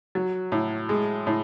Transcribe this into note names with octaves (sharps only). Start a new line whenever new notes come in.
F#3
A2
G#3
A2